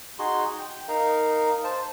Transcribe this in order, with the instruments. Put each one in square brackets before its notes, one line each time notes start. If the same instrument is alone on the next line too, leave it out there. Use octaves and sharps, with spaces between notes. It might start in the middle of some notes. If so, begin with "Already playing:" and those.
[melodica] D#4 F#4 G#4 C6
G5
D#4 A#4 F5
C5 A5